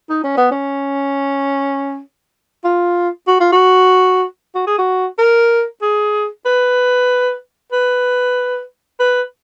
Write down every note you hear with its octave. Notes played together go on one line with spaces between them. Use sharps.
D#4
C#4
B3
C#4
F4
F#4
F4
F#4
F#4
G#4
F#4
A#4
G#4
B4
B4
B4